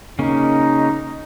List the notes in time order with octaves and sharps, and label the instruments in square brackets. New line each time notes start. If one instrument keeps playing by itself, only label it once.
[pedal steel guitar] C#3 A#3 C#4 [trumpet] D#4